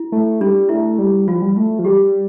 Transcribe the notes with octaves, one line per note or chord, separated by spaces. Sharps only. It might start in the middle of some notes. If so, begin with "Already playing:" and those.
Already playing: E4
A3
G3 D4
A3 E4
G3
F3 F4
G3
A3
F3
G3 G4